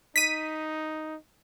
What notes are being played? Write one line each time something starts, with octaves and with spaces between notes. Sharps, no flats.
D#4 B6 D#7